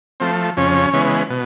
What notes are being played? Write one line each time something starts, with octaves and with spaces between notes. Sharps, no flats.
F3 A3 C4
F2 C#3 C#4
C#3 E3 G#3 B3
B2